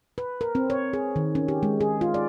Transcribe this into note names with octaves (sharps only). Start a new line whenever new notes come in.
B4
A#4
C4
C#5
G#4
D#3
C#4
G4
G#3
G#4
F4
D5